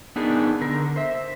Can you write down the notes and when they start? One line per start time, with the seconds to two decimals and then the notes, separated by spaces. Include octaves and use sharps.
0.16 B3 D4 D#4 G#4 A#4
0.61 D3 A#4
0.96 C5 E5